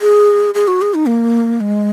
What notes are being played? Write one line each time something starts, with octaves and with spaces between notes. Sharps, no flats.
G#4
G#4
F#4
G#4
D#4
A#3
G#3